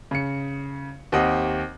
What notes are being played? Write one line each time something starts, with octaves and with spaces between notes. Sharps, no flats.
C#3 C#7
D#2 C4 G4 D#5 F#5